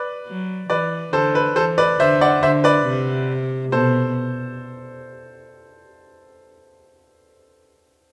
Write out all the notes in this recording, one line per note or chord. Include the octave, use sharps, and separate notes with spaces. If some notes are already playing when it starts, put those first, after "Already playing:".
Already playing: B4 D5
F#3
E3 B4 D5
D3 A4 C5
B4
E3 A4 C5
B4 D5
D3 C5 E5
D5 F#5
D3 C5 E5
B4 D5
C3
B2 A4 C5